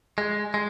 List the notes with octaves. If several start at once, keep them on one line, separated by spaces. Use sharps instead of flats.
G#3
G#3